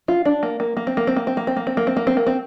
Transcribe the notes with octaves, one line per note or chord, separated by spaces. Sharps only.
F4
D4
A#3
A#3
A#3
C4
A#3
C4
A#3
C4
A#3
C4
A#3
C4
A#3
C4
A#3
C4
A#3
C4